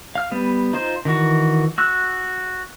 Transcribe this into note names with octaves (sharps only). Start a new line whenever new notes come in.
F5 F6
G3 B3
D#4 F4 C5
D#3 E3 F#4
F#4 E6 F#6